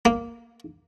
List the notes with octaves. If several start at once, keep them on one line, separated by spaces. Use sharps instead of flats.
A#3